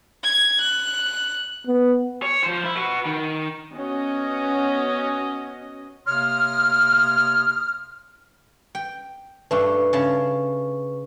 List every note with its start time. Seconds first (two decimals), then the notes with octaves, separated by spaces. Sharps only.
0.24 G#6
0.61 F#6
1.67 B3
2.22 C#5
2.44 F3 C5
2.65 E4
2.77 F#4 B4
3.05 D#3
3.73 B3 C#4 F#4 D#5
6.07 C3 A#3 C#5 C6 D#6 F6
8.75 G5
9.51 G2 A3 B4 C#6
9.93 C#3 A5